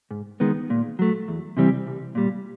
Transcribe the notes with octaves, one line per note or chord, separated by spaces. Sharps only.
G#2
D#3 G#3 B3
A#2
F#3 A3
E2
C3 E3 G3 C4
C2
A#2 G3